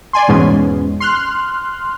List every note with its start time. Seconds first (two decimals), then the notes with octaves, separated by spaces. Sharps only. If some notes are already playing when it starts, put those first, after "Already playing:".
0.13 D5 G#5 C6
0.28 E2 G#2 B2 G#3 B3 C#4
1.00 C6 F6 F#6